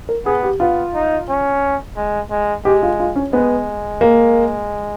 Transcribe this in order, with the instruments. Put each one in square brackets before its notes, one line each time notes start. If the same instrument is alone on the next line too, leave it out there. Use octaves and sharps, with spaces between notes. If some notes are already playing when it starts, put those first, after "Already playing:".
[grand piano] A#4
[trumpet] B3 [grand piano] G#4
[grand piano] G4
[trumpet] B3 [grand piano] F4
[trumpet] D#4
C#4
G#3
G#3
[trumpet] G#3 [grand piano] G4
[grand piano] F4
F4
C#4
[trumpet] G#3 [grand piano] B3
[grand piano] A#3